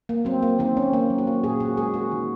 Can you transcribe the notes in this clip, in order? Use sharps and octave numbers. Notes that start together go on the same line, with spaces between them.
A#3
F#3 C4
A#3
D#3 C4
A#3 C#4
A#3
F#3
F#4
A#3
A#2 G#4
A#2 F#4
G#3 G#4
A#3 F#4
D#3